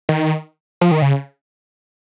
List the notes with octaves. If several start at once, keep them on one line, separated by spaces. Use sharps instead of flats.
D#3
F3
D#3
C#3